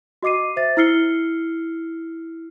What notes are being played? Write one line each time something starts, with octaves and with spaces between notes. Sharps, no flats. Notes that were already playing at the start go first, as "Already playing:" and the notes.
F#4 D#5 D6 C7 D#7
C5 E5 A6
E4 E6 F6 C7 C#7 G7